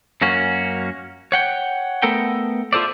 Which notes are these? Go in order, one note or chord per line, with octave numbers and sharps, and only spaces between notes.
F#2 A#3 C#4 F#4
C#5 F#5 G5
A3 B3 A4 A#4 F#5 G5
E4 F4 A4 C5 D5